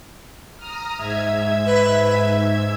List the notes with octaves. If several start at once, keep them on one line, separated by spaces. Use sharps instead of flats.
A#5 D#6 F6
G#2 E5 G#6
B4